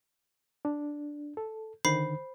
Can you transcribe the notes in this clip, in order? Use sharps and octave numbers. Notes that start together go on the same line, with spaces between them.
D4
A4
D3 D#3 C5 B5 C7